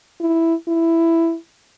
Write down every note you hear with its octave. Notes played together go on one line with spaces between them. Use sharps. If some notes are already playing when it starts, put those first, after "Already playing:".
E4
E4